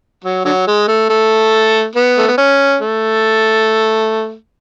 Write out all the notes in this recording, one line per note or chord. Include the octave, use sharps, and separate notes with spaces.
F#3
D3 F#3
G#3
A3
A3
B3
A3
B3
C#4
A3